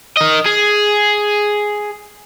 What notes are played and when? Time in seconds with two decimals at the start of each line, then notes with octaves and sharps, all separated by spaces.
0.17 A#4 D#5
0.46 G#4